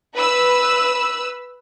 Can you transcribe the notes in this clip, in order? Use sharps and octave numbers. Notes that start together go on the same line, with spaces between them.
B4 E6